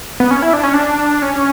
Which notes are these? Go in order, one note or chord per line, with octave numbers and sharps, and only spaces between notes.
B3
C#4
E4
D4
C#4
D4
C#4